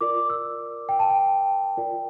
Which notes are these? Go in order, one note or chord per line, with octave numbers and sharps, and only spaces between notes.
F4 A#4 D5 D6
E6
G5
A5
G5
F4 A#4 D5